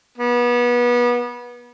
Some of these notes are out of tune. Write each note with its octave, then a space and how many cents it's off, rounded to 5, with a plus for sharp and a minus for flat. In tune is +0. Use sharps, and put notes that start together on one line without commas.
B3 -30